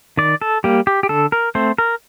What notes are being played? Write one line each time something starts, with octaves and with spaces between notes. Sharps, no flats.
D#3 D5
A4
G3 A#3 G4
G4
G4
D3 A4
A#4
A3 C4 C5
A#4